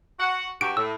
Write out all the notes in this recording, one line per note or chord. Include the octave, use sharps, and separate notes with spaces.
F#4 F#5
G2 F#4 G4 D7
A2 E6